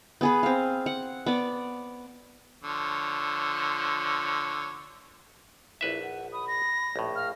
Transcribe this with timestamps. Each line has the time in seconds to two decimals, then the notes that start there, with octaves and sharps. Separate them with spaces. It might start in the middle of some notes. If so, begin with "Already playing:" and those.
0.21 B3 G#4 B4
0.43 C4 F5
0.86 F#5
1.26 B3 D5
2.64 D3 F3 C#5
5.81 A#1 E4 B4 E5
6.03 F#5
6.33 B5 D#6
6.48 A#6
6.96 A#1 A2
7.16 F5 F6